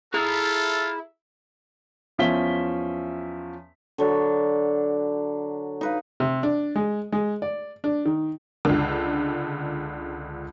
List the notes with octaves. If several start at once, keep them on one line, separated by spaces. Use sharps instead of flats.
E4 F4 G#4 A4 A#5
E2 F3 C#4 E5 B6 G7
D3 F#3 D5
D#4 B4 F5
C3
D4
G#3
G#3
D5
D4
D#3
C#2 D3